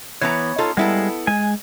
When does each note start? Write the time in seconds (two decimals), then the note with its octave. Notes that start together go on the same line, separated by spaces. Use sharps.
0.21 E3 B3 C#5 A#5
0.58 D#4 F4 A4
0.77 G3 G#3 B3 E4 A4
1.27 G#3 G#5